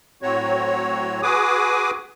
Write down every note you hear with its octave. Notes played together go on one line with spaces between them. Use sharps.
A2 F#3 C4 F#4 C#5
F#4 G#4 B4 G#5 D6 D#6